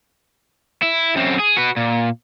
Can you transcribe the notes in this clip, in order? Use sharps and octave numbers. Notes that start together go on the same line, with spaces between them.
E4
F#2 C4
G#4
F#4 B4
A#2